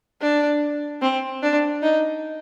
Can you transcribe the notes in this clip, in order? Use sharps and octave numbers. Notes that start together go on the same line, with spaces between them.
D4
C4
D4
D#4